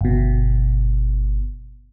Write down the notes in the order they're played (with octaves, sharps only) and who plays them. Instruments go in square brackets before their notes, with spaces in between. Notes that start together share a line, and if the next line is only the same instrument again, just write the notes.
[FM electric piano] G1 B2